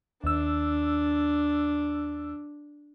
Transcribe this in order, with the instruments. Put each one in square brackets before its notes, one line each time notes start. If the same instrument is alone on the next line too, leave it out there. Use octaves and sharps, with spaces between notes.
[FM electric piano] D#2 E6 [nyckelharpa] D4